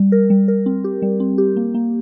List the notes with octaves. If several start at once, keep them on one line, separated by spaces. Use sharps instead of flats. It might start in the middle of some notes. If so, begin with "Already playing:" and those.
Already playing: G3
A#4
G3
A#4
C4
G4
G3
C4
G4
A#3
A#3